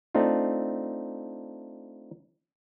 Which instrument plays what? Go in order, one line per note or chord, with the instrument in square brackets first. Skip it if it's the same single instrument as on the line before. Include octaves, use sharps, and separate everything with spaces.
[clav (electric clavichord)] A3 C4 D4 D#4 F4